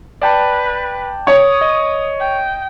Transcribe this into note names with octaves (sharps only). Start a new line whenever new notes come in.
B4 D5 G5 A5
C#5 D#6
D#5
G5